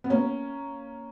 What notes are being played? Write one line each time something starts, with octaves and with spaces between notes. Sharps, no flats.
B3
A#3 C#4